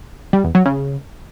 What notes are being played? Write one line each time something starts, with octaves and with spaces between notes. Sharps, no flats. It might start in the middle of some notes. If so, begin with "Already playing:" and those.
G3
E2
F#3
C#3